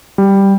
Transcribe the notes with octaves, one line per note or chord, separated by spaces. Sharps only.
G3